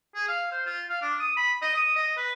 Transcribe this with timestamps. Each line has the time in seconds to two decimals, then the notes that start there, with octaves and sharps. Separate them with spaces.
0.15 G#4
0.28 F5
0.51 C5
0.66 F4
0.89 F5
1.01 D4
1.20 D#6
1.37 B5
1.62 D#5
1.75 D#6
1.96 D#5
2.17 B4